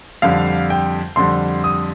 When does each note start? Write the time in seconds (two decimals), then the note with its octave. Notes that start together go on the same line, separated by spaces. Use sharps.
0.22 F2 D3 G3 F5
0.70 G5
1.16 F2 D3 G3 C6
1.64 D#6